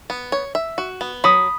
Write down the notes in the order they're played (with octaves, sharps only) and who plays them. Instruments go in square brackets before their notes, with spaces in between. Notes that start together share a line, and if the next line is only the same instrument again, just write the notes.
[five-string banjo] B3
C#5
E5
F#4
B3
[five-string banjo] F#3 [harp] B5 D#6